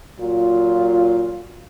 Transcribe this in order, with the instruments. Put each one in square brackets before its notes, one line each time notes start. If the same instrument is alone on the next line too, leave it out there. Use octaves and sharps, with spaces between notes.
[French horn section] A#2 F#3 F4